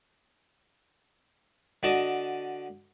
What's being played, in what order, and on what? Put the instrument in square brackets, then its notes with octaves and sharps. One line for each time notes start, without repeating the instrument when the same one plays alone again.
[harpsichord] D3 F#4 D5 D#5 A5